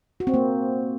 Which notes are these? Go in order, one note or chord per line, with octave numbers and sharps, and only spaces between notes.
F#4
C4
A#3